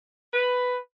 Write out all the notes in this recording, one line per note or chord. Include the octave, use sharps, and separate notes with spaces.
B4